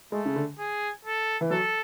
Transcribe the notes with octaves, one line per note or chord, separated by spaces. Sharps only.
G#3 A3
C#3
D3
G#4
A4
E3
F#3 A4